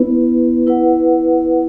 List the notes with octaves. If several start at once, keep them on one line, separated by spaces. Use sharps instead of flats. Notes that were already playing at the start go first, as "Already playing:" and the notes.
Already playing: B3 E4 B4
E4 B4 F#5